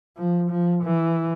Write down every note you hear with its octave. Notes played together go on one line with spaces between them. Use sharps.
F3
F3
E3